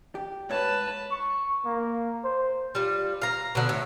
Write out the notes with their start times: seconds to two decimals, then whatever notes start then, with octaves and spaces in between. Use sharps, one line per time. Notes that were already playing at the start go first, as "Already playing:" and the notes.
0.15 G4
0.50 G#2 B4 C#5 F5 A5
1.11 C#6
1.65 A#3
2.24 C5
2.75 G3 F4
3.22 F5 A#5
3.55 B2 D3
3.69 A2